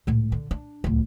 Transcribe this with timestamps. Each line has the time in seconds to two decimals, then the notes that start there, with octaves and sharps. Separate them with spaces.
0.07 C#2 A2
0.32 D3
0.51 D4
0.84 D1 C#2